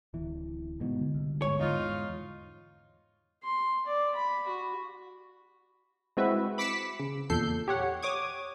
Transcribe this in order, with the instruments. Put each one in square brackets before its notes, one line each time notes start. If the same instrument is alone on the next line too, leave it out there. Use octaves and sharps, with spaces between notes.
[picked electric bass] D1 E3
G1 G#2 B2
[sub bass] D3
[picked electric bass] C2
[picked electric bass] G1 G#2 [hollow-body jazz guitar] C#5
[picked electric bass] E2 G#2 [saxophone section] D#4 F4
[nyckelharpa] C6
D5
B5
F#4
[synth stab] G#3 C4 E4 F#4 B4 E5
B5 D6 B6 C#7 E7
C#3
E2 A#2 A4 G6 C7
G4 C#5 F#5
C#5 D6 D#6 G#6